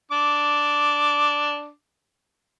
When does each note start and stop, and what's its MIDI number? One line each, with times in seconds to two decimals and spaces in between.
0.11 1.70 62
0.11 1.70 86